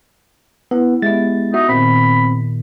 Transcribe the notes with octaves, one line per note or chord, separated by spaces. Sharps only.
B3 E4 F#5
G#3 B3 G4 E5 A6
D#4 F#4 E5
A#2 D#3 C4 B5